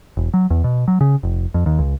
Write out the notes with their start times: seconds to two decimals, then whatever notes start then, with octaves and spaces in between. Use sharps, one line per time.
0.17 E1
0.34 F#3
0.50 E2
0.64 B2
0.88 F#3
1.01 C#3
1.23 F1
1.54 F2
1.66 D#2
1.79 C#2